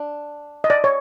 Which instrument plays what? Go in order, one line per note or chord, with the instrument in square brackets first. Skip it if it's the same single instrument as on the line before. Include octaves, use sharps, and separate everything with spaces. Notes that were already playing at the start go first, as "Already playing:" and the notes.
Already playing: [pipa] D4
[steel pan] D#5
D5
C#5